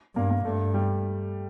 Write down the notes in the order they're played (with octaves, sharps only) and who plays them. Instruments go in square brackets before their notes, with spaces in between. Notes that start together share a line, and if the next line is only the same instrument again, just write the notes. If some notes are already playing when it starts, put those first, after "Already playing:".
[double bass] G2 [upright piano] A#3
[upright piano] A#3
[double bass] G2 [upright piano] A3
[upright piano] G3